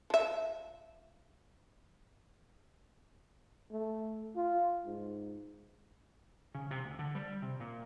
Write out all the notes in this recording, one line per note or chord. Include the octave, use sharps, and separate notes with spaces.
F3 E5
A3
F4
G#2
C#3
C3
D2
D3
G3
C3
A#2